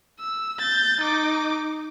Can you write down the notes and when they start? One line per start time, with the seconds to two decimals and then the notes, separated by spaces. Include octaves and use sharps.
0.19 E6
0.59 G6 A6
1.01 D#4 D6